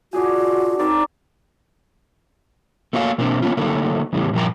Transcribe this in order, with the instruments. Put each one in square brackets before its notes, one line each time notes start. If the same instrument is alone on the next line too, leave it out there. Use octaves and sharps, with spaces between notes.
[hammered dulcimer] D4 G#4 G#5 [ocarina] F4 [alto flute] F#4
[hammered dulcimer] C4 A#4 D5 [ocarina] D#4
[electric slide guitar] A3 A#3 F#4 C#5 F5
B2 A#3 C4 D4
A#3 B3 C#4 F4
D3 F#3 A3 A#3 D#4
E2 A2 C#3 G3
G2 A#2 F3 G4 G5 A#5